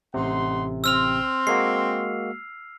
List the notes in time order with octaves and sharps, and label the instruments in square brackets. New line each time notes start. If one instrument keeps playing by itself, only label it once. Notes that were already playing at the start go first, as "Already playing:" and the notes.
[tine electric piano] A1 C3 [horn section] D#4 F#5 C6
[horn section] C4 C6 [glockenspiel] E6 F6 F7
[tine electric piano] G#3 A#3 F#4 [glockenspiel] C7